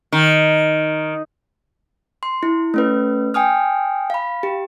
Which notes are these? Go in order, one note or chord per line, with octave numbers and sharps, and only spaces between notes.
D#3
C6
E4
A3 C#4 B4
G5 G#5 D#6 F6
F5 B5
G4